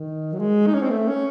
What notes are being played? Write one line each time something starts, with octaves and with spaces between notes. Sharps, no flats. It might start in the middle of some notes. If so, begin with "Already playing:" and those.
Already playing: D#3
F#3
G#3
D#4
C#4
C4
A3
C#4